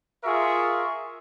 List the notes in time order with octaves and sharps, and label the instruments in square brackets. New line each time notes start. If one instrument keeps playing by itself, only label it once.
[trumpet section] F4 G#4 A#4 E5 C#6